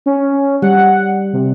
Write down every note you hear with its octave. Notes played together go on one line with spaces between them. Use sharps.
C#4
G3 F#5
C3